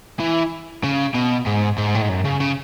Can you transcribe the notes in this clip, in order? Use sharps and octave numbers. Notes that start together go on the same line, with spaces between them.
E3
C#3
B2
G#2
G#2
A2
G#2
F#2
C#3
C#3